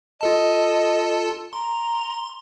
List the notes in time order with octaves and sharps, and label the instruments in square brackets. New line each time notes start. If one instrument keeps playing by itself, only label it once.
[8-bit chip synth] F4 A4 A5 [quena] D#5
[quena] A#5 [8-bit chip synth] C6